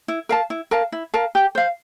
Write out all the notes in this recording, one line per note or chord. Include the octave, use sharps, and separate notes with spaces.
E4
A#4 F5 A5
E4
A#4 F5 A5
E4
A#4 F5 A5
G4
C5 F5